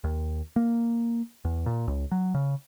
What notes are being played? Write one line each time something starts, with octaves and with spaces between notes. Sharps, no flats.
D#2
A#3
E2
A#2
C#2
F#3
C#3